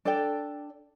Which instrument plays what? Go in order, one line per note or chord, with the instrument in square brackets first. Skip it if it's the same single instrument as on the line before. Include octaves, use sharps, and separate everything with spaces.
[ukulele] D4 A4 D5 G5